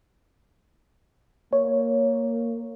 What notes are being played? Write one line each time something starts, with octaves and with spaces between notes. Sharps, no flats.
A#3 C#5